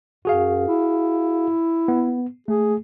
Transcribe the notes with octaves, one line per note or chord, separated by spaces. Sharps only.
F#2 F#4 G#4 F5
E4
B3
A3 G#4